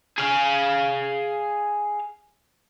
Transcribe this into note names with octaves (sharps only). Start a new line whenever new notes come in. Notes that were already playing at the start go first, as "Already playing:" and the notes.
G#4 F5